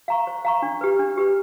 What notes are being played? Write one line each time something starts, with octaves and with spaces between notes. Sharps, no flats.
F5 A#5 C#6
C5
F5 A#5 C#6
D4
G4 B4
D4
G4 B4